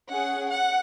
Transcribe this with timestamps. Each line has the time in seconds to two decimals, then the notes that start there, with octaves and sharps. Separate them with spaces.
0.10 C#4 G#4 F#5
0.50 F#5